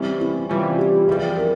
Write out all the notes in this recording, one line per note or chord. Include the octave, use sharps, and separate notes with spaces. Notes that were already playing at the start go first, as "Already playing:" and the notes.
Already playing: C3 E3 G3 C4 C#4
E4
C3 E3 G3 C#4 F4
G4
F2 E3 G3 G#4
A#4